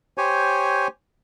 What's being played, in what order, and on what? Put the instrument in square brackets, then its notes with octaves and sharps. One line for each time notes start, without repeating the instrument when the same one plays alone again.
[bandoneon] G4 C5 C#5 G#5